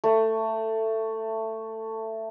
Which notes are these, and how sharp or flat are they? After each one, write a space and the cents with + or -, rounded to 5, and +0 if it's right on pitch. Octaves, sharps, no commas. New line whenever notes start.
A3 +15